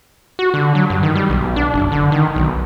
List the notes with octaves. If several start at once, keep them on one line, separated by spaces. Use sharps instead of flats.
F#4
D3
F#3
G2
D#3
G3
B1
D4
F#1
D3
D#3
B1